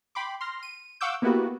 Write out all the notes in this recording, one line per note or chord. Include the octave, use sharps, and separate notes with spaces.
G5 B5 C6 D6
C6 F6 A#6
D#7
F5 F#5 C#6 D6 E6 G6
A#3 B3 E4 F#4 G4 B4